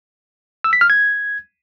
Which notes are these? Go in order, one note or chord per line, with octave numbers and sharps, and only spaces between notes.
E6
B6
F6
G#6